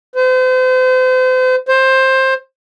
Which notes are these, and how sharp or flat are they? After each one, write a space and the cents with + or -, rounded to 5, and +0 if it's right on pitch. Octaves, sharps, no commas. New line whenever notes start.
C5 -40
C5 +15